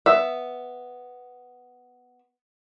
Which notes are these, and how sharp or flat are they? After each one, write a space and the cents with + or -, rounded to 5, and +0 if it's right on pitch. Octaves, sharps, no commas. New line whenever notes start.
B3 +5 E5 +5